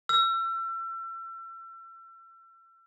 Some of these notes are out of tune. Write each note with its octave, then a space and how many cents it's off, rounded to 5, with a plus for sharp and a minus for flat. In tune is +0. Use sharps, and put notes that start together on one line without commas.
E6 +35